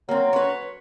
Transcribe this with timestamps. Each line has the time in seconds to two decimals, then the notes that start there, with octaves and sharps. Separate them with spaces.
0.09 F#3 A#3 C4
0.33 B4 C#5